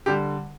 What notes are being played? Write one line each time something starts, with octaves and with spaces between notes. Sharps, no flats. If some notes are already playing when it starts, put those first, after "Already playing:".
D3 G3 G4